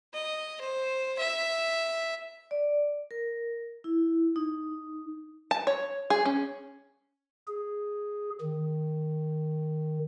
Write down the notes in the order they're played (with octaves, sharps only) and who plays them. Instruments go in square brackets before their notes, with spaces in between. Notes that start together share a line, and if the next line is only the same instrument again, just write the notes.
[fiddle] D#5
C5
E5
[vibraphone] D5
A#4
E4
D#4
[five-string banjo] A5
C#5
G#4
C#4
[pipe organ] G#4
D#3